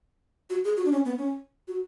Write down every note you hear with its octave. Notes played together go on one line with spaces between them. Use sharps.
F#4
G#4
F#4
D4
C#4
B3
C#4
F#4